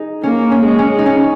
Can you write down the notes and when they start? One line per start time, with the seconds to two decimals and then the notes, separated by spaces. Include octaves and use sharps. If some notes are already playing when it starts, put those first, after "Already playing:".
Already playing: D#4 G#4
0.23 A#3 C#4
0.51 C#4
0.65 G#3
0.79 C#4
0.99 D#4
1.06 C#4